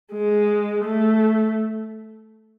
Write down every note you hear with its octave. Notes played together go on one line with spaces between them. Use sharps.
G#3
A3